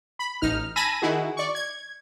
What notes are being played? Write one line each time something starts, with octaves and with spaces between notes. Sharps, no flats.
B5
A1 D#4 F6
G#5 A5 B5 E6 A#6 D#7
D#3 D#4 E4 F#4 G#4
D5 C#6
G#6